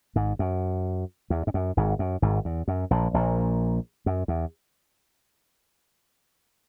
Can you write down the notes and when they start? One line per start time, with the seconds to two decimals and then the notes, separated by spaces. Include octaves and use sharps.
0.15 G#1 G#2
0.39 F#2
1.30 E2
1.47 G#2
1.54 F#2
1.77 G#1 G#2
1.99 F#2
2.22 G#1 G#2
2.45 E2
2.68 F#2
2.91 A#1 A#2
3.14 A#1 A#2
4.06 F#2
4.28 E2